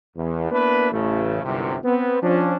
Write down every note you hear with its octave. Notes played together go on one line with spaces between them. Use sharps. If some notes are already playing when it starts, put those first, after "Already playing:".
E2
A#3 B3 D4 E4 B4
A1 C#3 A3
G1 C2 F#2 C3
B3 C4
F3 C#4 D4